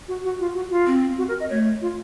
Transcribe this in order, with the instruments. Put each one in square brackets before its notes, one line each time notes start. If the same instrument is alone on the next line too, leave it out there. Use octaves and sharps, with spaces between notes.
[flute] F#4
F#4
F4
F#4
F4
[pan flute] C4
[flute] F#4
A#4
D#5
[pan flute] A3 [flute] C#5
[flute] F4